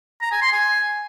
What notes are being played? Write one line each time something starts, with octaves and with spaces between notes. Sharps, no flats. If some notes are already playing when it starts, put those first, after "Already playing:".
A#5
G#5
C6
G#5